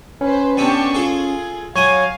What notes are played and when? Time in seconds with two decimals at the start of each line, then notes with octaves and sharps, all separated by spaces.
0.21 C#4 B4 C5
0.57 D3 B3 C4 G4 A5 C#6
0.94 F4 G#4 A4
1.76 F#3 C#5 F5 G#5 D#6